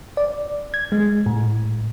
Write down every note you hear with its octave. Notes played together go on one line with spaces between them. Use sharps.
D5
G#6
G#3
A2